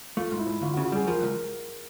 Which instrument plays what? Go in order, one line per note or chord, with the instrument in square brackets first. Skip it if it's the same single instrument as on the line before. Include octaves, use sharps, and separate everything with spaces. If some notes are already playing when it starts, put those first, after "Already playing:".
[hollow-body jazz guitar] A3 [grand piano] F4
[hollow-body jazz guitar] G#2
[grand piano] E4
[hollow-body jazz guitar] G#2
[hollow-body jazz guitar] D2 [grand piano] F4
[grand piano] F#4
[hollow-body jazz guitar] C#3
[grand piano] F#4
[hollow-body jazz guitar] G3 [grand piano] G#4
[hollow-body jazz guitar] F3 [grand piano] A#4
[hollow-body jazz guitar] C#2